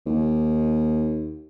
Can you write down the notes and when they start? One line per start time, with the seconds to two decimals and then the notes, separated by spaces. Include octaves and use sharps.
0.06 D#2